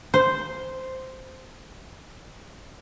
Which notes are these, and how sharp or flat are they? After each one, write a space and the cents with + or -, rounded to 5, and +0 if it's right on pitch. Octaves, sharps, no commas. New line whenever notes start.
C5 -5